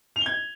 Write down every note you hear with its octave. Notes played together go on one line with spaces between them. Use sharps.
F7
G7
G#6